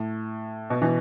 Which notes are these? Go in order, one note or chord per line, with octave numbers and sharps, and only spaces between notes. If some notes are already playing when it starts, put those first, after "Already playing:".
Already playing: A2
B2
B2 E3